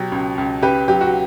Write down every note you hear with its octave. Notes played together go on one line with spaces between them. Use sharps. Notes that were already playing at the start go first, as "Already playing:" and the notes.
Already playing: B2 F#3 G4
C#2
C#2
C#3 G4 B4
F#3 G4
F#4